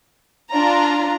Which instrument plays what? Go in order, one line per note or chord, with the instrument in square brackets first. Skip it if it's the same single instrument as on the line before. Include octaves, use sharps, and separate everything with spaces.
[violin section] D4 F4 A#5